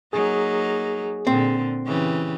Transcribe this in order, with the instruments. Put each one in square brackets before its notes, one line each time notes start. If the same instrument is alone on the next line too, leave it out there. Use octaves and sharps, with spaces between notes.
[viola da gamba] F#3 A#3 D#4 [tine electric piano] G#4
[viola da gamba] A#2 D3 [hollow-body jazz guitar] C4
[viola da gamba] C#3 E3 G4